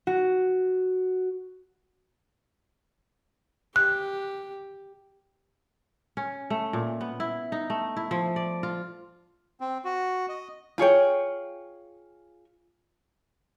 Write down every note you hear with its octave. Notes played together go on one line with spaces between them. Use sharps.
F#4
G4 F#6
C#4
A3
A#2
B3
E4
D#4
A3
E4
F3
D5
F4
C4
F#4
D#5
F4 G#4 C#5 G5